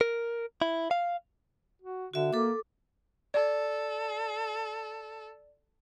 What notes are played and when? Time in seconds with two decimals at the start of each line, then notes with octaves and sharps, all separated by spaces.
0.01 A#4
0.62 E4
0.91 F5
1.82 F#4
2.14 D3 F#4 E5
2.33 A#3 A4 D6
3.34 A4 D5